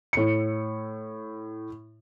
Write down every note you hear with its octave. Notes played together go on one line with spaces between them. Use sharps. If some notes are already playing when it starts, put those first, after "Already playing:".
A2 C#7